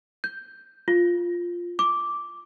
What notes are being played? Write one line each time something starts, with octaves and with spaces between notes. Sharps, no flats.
G6
F4
D6